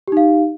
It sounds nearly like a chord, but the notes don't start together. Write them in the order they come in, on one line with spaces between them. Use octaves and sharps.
G4 D#4 F5